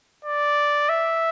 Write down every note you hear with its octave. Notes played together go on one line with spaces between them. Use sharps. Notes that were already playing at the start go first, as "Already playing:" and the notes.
D5
E5